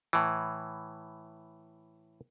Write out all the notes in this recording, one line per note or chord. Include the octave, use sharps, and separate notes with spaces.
A2 E3